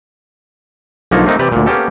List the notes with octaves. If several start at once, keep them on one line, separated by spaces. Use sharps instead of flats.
B1 D3 F3 A#3 D#4 C#5
A3 A#3 C4 D#4
C3 E3 G4 B4 D5
D2 A#2
A#3 B3 C#4 G4 A4